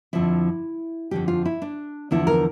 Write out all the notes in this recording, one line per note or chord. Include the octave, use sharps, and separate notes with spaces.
F2 D3 F3 E4
F2 D3 F3 G4
F4
E4
D4
E2 D3 F3 E4
A#4